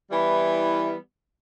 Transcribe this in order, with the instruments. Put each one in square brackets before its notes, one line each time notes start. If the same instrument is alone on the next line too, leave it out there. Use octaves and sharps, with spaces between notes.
[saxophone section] E3 G3 B3 E4